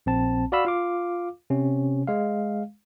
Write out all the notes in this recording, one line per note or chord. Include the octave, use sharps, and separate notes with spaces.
A#1 C4 A5
F#4 D5 F5 B5 E6
F4 F5 D6
C3 C#4
G#3 F5